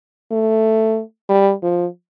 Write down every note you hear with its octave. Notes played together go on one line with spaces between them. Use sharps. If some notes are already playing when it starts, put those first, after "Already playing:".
A3
G3
F3